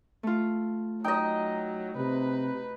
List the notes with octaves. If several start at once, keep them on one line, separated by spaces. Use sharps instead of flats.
A3 F4
F#3 D#4 D#5 G5
C3 B4